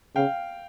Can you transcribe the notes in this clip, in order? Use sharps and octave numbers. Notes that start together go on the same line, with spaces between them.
C#3 F5 G5